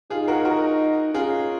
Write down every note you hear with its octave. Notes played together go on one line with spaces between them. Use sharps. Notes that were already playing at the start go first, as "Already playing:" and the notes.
D#4 F4 G#4
F#4 A#4
F#4 A#4
C#4 F4 G#4